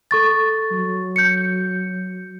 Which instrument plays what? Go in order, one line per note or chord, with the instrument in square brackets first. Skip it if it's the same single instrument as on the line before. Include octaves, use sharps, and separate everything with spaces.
[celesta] A4 C#6 A6
[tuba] F#3
[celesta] G6 C#7